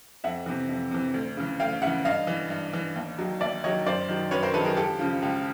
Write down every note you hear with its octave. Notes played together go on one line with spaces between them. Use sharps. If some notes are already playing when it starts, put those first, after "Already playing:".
F2 E5 F#5
C3 E3
F2
C3 E3
D2
C#3 E3
D2 F5 G5
C#3 E3 E5 F#5
G2 D#5 F5
E3
G2
E3
D#2
D#3 F#3
D#2 D5 E5
D#3 F#3 C#5 D#5
F#2 C5 D5
D#3 F#3
F#2 B4 C#5
A#4 C5
D#3 F#3 A4 B4
G#4 A#4
C#2 G4 A4
C#3 F3
C#2